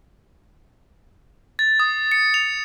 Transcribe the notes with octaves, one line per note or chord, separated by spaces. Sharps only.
A6
D#6
C#7
F7